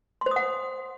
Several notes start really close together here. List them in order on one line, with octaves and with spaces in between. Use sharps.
C6 C5 D#6 F#5